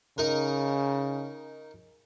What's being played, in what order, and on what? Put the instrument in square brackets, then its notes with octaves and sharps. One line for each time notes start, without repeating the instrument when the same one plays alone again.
[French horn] C#3 [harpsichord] D#4 A#4